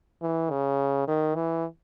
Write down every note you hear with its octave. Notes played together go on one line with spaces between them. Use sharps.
E3
C#3
D#3
E3